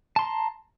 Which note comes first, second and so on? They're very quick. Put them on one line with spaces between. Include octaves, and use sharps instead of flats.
A5 C6 A#5